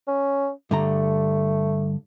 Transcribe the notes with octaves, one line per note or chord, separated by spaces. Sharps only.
C#4
G2 D3 A3 A#5